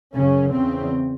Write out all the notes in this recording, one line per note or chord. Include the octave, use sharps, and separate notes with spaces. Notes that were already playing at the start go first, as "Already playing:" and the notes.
F#2 C#3 C#4
E2 C#3 C4